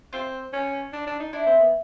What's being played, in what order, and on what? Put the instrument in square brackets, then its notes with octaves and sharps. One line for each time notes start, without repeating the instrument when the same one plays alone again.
[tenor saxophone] C4 [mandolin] F4
[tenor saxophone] C#4
D4
D4
D#4
[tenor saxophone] D4 [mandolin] E4
[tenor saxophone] C4
B3